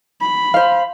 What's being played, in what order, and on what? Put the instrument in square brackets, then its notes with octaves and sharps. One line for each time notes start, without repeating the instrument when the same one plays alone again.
[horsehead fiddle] B5
[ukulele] C5 F5